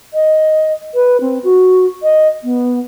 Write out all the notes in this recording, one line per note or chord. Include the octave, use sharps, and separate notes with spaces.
D#5
B4
C4
F#4
D#5
B3